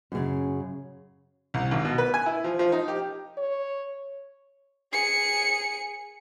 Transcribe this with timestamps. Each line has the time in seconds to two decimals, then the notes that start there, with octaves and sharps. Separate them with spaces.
0.12 F#2 C#3
1.54 C2
1.71 G#1
1.85 B2
1.98 B4
2.14 G#5
2.26 E4
2.44 F3
2.59 F3
2.72 D#4
2.88 G4
3.38 C#5
4.92 G#4 C#7